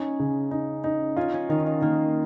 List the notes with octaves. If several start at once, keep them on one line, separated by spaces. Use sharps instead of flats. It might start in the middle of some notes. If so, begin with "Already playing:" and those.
Already playing: C#4 D#4
C#3
D#4
D#4
C#4 F4
C#4
D#3 D#4
D#4
D#3 A#3